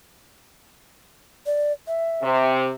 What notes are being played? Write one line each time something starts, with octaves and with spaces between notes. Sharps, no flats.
D5
E5
C3